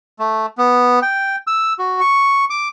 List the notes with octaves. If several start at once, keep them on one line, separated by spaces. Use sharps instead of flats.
A3
B3
G5
E6
F#4
C#6
D6